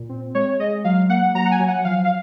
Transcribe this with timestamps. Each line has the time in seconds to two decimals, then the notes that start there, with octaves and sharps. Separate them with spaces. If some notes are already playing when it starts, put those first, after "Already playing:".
Already playing: A#2
0.09 C4
0.35 G#3 C#5
0.59 G#3 D#5
0.84 F#3 F5
1.09 A#3 F#5
1.35 F#3 A#5
1.45 F#5
1.51 G#5
1.60 F#3
1.68 F#5
1.85 F3 F5
2.05 F5